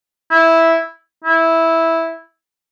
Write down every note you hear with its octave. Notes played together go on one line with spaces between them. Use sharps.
E4
E4